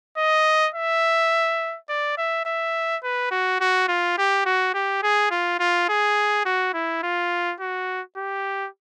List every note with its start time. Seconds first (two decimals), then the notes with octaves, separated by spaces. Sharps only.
0.17 D#5
0.74 E5
1.89 D5
2.18 E5
2.45 E5
3.03 B4
3.31 F#4
3.60 F#4
3.88 F4
4.18 G4
4.46 F#4
4.74 G4
5.03 G#4
5.31 F4
5.59 F4
5.89 G#4
6.45 F#4
6.74 E4
7.03 F4
7.60 F#4
8.17 G4